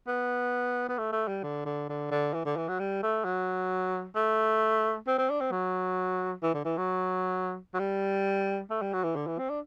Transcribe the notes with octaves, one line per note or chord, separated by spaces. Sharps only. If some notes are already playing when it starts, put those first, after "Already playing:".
B3
B3
A3
A3
G3
D3
D3
D3
D3
E3
D3
E3
F#3
G3
A3
F#3
A3
C4
C4
D4
C4
F#3
E3
D3
E3
F#3
F#3
G3
A3
G3
F#3
E3
D3
E3
C4
D4